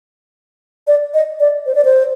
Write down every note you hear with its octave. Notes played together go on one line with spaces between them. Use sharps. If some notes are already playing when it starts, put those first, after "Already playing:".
D5
D#5
D5
C5
D5
C5